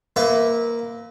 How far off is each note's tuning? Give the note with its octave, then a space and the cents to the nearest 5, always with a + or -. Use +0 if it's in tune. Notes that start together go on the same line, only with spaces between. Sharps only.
A#3 +0 E4 -20 B4 +35